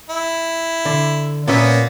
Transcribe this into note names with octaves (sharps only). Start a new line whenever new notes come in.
E4
D3
A#2 A#3 B3 C#4 E5